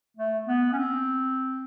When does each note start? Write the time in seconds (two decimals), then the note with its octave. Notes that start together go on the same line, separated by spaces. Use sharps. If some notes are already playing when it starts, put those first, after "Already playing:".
0.17 A3
0.47 B3
0.72 C#4
0.77 C4